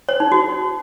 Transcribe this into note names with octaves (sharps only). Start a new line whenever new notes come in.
C#5
D#4
F#4